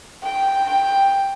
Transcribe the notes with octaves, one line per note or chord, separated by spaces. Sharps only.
G5
G5